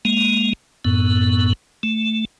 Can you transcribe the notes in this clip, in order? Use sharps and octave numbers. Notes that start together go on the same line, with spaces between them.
G#3 A#3
F#2 A2 B3
A3